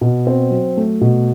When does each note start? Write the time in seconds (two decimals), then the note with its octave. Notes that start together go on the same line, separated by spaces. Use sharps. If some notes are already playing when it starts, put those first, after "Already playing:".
0.01 B2
0.27 C4
0.51 F#3
0.77 A3
1.01 B2